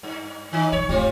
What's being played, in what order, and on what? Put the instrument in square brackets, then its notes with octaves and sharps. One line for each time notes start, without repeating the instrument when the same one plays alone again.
[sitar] G2
D#3 D#4
[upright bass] B1 E3 [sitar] C#5
[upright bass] D1 F#2 [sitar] G3 C4 F4